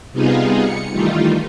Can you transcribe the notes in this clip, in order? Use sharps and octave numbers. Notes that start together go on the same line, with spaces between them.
C3 G3 B3 D#4 F4 G#4
C#7
D#3 E3 G3 A3 D#4 F4